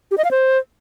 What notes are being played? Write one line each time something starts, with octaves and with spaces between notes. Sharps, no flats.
G4
D#5
F5
C5